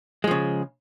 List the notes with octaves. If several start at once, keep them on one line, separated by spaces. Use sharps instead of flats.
C#3 F3 G#3